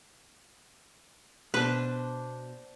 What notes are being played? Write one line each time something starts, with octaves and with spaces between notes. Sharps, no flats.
B2 D4 B4 C5